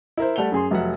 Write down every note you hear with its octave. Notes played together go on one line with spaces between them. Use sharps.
E4 A#4 C5
G3 A3 F#5 F7 G7
F#2 G#4 C6
F1 F#3 E5 F#5